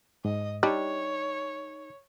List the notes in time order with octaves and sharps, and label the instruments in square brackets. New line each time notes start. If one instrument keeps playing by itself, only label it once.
[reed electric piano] G#2 [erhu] D#5
[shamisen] G3 D4 [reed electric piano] D#4 [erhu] C#5